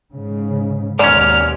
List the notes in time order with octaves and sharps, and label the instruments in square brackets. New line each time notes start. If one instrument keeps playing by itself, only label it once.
[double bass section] G#2 C#3
[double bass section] D#2 B2 [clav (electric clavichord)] G#2 C#4 [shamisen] D5 [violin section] F6